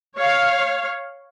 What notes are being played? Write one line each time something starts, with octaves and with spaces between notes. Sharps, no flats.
C#5 F5